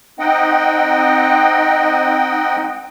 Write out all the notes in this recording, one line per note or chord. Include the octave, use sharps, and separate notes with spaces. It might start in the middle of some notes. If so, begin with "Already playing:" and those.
C4 D#4 D#5 F#5 G5